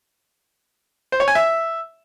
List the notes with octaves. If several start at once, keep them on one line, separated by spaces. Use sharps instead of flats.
C5
C#5
G#5
E5